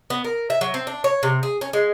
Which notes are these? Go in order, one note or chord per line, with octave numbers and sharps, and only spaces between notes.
B3
A#4
E5
F#3
C4
D4
C#5
C3
G#4
C#4
G#3